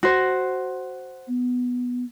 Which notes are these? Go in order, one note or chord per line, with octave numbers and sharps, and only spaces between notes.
F#4 C5
B3